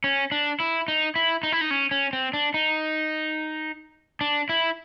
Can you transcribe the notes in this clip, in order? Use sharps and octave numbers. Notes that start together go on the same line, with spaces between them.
C#4
D4
E4
D#4
E4
D#4
E4
D#4
C#4
C#4
C4
D4
D#4
D4
E4